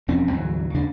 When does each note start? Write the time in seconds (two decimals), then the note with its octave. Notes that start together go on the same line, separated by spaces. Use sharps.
0.08 E1 F2 C4 C#4
0.31 D2 G#2 E3 F#3
0.74 D#2 C#3 G#3 D4